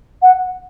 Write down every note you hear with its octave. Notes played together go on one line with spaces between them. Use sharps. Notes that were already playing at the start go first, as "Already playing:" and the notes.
F#5